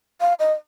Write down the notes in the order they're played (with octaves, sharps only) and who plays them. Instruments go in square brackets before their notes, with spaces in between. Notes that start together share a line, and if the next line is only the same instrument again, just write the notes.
[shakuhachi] F5
D#5